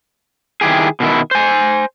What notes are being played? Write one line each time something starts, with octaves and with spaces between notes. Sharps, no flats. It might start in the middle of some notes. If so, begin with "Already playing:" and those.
D#3 E4 G4 G#4
B2 D#3 E4
C5 G#5